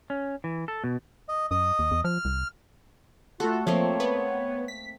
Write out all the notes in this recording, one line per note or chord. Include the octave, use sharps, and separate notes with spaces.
C#4
E3
A4
B2
D#5
F#2 D#5 D#6
D#2
E2
F3 F6
C2
A3 F4 F#4 A4
F3 A3 A#3 C4 C#5
B3
B6